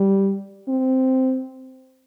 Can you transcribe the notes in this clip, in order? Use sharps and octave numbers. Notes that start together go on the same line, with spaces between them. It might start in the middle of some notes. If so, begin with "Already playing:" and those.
Already playing: G3
C4